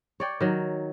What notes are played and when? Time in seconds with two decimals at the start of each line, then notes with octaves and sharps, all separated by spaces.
0.20 C#5 D5 G5
0.41 D#3 F#3